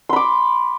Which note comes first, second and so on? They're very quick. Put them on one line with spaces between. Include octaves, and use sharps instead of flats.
C6 B5 D6